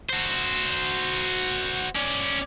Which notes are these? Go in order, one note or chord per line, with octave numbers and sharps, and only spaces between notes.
F#4 C5
C#4 D5